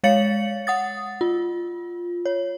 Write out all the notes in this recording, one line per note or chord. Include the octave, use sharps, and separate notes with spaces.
G#3 C#5 F5 A6 C#7 F#7
F#5 D#6 A6
F4
C#5